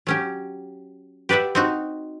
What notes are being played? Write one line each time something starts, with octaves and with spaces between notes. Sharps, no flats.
F#3 C#4 G4
G4 B4 D5 E5 F#5
C4 D#4 F#4